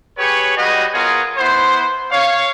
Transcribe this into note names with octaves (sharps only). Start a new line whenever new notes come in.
G4 G#4 B4 C#5
G3 F#4 G#4 B4 D#5
B3 F4 G#4 A#4 C#5
B3 E4 C5
C#5 F5